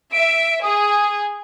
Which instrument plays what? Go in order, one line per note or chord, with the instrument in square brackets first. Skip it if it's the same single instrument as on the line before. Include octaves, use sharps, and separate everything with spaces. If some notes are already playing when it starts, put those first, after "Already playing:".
[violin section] E5 [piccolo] D7
[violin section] G#4 [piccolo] D#6